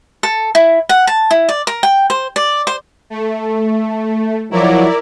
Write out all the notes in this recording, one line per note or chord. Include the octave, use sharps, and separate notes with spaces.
A4
E4
F#5
A5
E4
D5
A#4
G5
C5
D5
C5
A3
F3 F#3 E4 A#4 D5